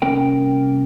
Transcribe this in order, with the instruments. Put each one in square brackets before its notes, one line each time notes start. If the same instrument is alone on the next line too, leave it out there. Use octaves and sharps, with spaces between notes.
[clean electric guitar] C2 A#3 C#4 A#4 G5